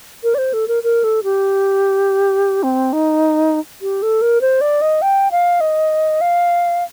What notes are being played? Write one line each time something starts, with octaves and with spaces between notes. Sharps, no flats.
A#4
D5
C5
A4
A#4
A#4
A4
G4
C4
D#4
G4
A4
A#4
C5
D5
D#5
G5
F5
D#5
F5